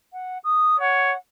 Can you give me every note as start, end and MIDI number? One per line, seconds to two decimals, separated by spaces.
0.13 0.38 78
0.44 0.76 87
0.80 1.14 73
0.80 1.17 78